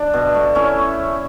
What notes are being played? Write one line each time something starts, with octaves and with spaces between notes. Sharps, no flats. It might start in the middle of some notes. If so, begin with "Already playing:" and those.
Already playing: D4
B2
A3
A3 C#4 E4